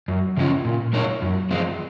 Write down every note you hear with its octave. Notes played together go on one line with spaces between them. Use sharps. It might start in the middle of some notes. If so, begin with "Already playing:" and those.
F#2
C#3 F3 G#3 C#4
A#2
G#3 D#4 A#4 C#5
F#2
F3 G#3 C4 F4